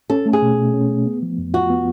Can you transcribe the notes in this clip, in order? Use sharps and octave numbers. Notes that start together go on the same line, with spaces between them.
C#4 A4
A3
G#4
B2
B2
C#4
A3
B3
F3
F2
F4 F#4
B3